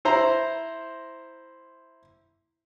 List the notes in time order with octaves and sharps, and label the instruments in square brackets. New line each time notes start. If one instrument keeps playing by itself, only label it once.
[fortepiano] E4 C5 A#5